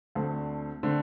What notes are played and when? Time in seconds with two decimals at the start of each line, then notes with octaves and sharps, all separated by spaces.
0.15 D2 D3 A3 C4
0.83 D3 A3 C4